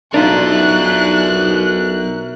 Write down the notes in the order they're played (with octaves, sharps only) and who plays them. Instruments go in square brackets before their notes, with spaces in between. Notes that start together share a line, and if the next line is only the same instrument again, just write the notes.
[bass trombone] B1 [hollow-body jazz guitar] D4 D#4 F4 [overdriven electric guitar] A#4 E5 [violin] F#6